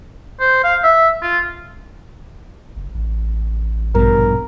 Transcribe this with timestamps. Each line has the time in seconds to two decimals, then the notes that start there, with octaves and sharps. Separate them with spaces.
0.40 C5
0.64 F5
0.83 E5
1.22 F4
2.77 F#1
2.94 A1
3.95 A#1 G2 B2 A#4